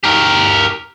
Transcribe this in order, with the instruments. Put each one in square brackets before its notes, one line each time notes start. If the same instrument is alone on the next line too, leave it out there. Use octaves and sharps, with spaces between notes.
[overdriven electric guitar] G4 A#4